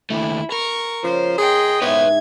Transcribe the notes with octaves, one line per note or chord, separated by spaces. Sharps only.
D#2 A3 E4
A#4 C#6
C#3 F3 C5
G#4 D#5 G5 C6
G#2 B3 E4 B4 C#5 G#6